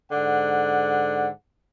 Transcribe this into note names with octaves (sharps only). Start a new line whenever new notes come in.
G#2 D3 F#5